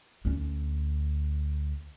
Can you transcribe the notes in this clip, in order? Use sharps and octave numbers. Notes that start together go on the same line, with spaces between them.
D2 C#4